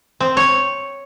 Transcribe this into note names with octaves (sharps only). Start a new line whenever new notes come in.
C4
C#5